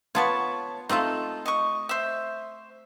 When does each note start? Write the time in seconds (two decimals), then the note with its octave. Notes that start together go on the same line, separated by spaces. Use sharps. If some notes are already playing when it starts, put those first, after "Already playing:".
0.15 B3 F4 C#5 A5 C#6
0.89 A3 C4 D#4 F4 A4
1.46 D#5 C#6
1.89 C5 E5